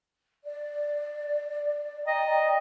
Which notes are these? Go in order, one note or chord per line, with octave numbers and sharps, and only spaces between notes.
D5
D5 D#5 G5 A#5